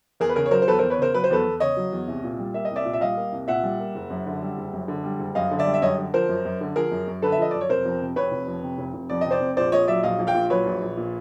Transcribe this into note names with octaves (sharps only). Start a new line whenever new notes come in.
E2 G#4 A#4
B4
C#3 G#4 A#4
C#5
F#3 A#4 C5
C5
E2 A4 B4
A#4 C5
E2
B4 C#5
C#3 A#4 C5
F#3 B4
C5
E2 A4 B4
E2
C#3 C#5 D#5
F#3
E2
C2
A#2
G3
A#3 E5
D#5
C2
D5 E5
A#2
E5
G3 D#5 F5
A#3
C2
A#2 E5 F#5
G3
A#3
F#1
F#2
D3
G3
F#1
F#2
D3
G3
F#1
F#2 D#5 F5
D3
D5 E5
G3
E5
F#2 C#5 D#5
D3
F3 A#4 C5
F#2
F#2
D3
F3 G#4 A#4
F#2
F#2
D3 A4 B4
E5
F3 D#5
F#2 D5
C#5
F1 A#4 C5
F2
C3
F1 B4 C#5
F1
F2
C3
F1
F1
F2 D5
C3 D#5
C5 D5
F1
A#1 C5 D5
A#2 C#5 D#5
F#3 D5 E5
A#1 D#5 F5
A#1
F5 G5
A#2
F#3 B4 C#5
A#1
A#1
A#2